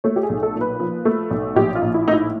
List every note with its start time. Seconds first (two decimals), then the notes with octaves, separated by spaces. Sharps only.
0.04 A3 C#5
0.16 G4
0.23 G#4
0.29 B1
0.43 A4
0.55 A#2
0.61 B4
0.80 F3
1.05 A3
1.31 B1
1.56 A#1 G4
1.75 F4
1.82 A#1
1.94 E4
2.07 A2 D#4
2.13 E4